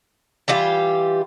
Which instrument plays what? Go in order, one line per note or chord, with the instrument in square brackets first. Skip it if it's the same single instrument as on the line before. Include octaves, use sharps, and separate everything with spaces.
[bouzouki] E3 G3 F4 G4